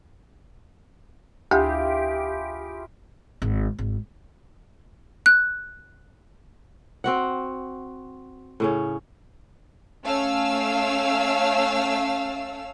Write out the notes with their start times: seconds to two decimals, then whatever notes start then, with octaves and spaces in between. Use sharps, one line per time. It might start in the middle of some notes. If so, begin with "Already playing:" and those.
1.51 D2 E4 F4 G4 G#4
3.42 G#1
3.79 G#1
5.26 F#6
7.04 C4 F#4 F#5
8.60 A2 C#3 C#4
10.05 A3 C#4 F5 E6